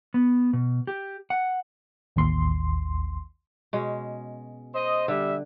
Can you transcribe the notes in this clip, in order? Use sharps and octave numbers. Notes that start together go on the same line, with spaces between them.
B3
B2
G4
F#5
A1 D#2 C6
B2 G#3 C#4
C5 D#5
D3 G3 E5